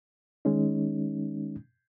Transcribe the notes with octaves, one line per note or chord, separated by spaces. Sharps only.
D#3 G#3 C#4 D#4